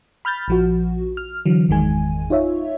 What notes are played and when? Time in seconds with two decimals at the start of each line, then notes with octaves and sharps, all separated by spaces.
0.25 B5 F6 G6 A6
0.48 A#1 F3 F#4
1.17 F6
1.46 D3 E3 F#3
1.69 G1 E2 D#3 G#3 G#5
2.30 D#4 F4 C#5 E5